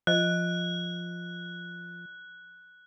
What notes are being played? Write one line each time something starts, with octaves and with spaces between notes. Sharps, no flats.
F3 D#5 F#6